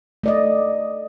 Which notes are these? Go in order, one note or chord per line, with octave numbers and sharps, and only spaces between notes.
A3 D5 D#5